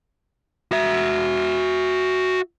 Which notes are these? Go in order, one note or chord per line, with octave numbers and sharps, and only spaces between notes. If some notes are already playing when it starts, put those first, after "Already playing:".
F#4 E5